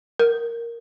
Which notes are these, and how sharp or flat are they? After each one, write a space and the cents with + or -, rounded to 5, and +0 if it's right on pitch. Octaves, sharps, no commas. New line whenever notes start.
A#4 +0